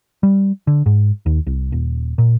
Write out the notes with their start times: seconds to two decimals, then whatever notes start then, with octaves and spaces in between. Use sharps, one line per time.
0.23 G3
0.67 D3
0.86 G#2
1.26 D#2
1.47 C2
1.72 D#1
2.18 A#2